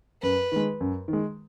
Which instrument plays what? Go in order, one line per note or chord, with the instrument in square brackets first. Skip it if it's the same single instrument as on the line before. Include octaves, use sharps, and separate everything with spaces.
[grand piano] F#2 [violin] B4
[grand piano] D#3 G#3
F#2
D#3
G#3